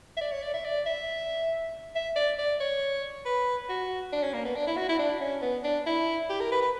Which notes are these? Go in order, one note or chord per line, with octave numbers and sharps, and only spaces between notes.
E5
D5
C#5
D5
E5
D5
E5
E5
D5
D5
C#5
B4
F#4
D4
C#4
A#3
B3
D4
E4
F#4
E4
D4
C#4
B3
D4
E4
G4
A#4
B4
B4